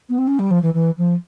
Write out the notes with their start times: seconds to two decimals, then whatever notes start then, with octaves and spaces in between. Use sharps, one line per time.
0.09 B3
0.18 C4
0.27 C#4
0.39 G3
0.51 F3
0.62 E3
0.74 E3
0.98 F3